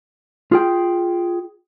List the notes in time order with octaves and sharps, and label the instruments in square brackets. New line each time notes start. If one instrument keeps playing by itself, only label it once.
[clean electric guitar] F4 G#4 G5